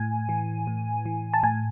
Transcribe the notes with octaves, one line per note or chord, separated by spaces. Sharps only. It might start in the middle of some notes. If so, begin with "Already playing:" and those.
Already playing: A2 G#5
E3
A2
E3
A5
A2 G#5